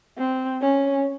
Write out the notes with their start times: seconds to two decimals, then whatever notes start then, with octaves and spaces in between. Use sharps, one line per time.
0.18 C4
0.61 C#4